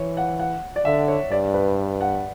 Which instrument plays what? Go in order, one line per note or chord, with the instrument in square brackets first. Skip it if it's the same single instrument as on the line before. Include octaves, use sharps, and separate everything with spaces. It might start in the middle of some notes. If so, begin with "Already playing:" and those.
Already playing: [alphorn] E3 [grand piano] C#5
[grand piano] F#5
F#5
D5
[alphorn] D3 [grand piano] E5
[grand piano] C#5
[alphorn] G2 [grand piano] D5
[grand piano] B4
F#5